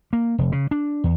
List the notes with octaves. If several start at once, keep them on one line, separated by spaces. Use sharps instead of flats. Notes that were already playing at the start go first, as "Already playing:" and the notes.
A#3
F1
C#3
D4
E2